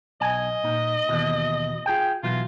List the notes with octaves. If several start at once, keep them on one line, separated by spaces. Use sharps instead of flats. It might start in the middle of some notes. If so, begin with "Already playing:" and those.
B1 D#5 G#5
A#2 D#4
D#2 B2 E3
F4 G#4 G5
B2 E3 F#3 F4